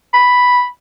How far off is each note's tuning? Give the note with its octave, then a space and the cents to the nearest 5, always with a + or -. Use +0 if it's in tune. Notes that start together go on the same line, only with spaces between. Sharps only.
B5 +0